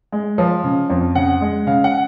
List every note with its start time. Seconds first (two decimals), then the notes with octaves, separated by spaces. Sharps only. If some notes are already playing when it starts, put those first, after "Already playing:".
0.12 G#3
0.38 F3
0.64 C#3
0.90 F2
1.15 C#3 F#5
1.41 G#3
1.67 C#3 F5
1.84 F#5